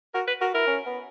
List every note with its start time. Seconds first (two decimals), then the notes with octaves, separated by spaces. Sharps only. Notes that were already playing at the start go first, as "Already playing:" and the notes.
0.14 F#4 A#4
0.28 B4
0.41 F#4 A#4
0.54 E4 A#4
0.67 C#4
0.86 B3